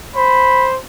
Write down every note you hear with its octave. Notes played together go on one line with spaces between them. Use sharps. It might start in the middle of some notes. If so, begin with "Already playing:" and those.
C5 B5